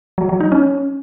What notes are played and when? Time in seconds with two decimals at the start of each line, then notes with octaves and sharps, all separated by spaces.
0.18 F#3
0.29 F#3
0.40 D#4
0.52 C#4